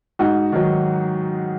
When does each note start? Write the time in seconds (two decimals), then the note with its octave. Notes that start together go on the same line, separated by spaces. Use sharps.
0.19 G#2 D#4 F#4
0.52 D#3 F#3